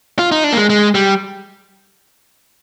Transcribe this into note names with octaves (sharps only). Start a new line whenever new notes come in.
F4
D#4
D4
A#3
G#3
G#3
G3